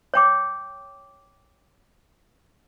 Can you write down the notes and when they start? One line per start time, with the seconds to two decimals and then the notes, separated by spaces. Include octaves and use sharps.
0.14 C#5 G5 D6